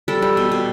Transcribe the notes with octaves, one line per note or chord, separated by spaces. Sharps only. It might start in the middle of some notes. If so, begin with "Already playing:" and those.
G3 A4
G3
B2
B2